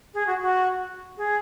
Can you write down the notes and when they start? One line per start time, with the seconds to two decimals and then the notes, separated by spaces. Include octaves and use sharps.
0.14 G#4
0.27 F#4
0.42 F#4
1.17 G#4